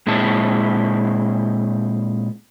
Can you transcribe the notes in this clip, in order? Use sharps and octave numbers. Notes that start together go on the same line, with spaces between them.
A#2 G#3 C4 E4 A5